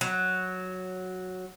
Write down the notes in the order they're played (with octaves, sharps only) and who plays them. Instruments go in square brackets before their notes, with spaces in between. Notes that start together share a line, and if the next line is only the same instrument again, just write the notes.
[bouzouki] F#3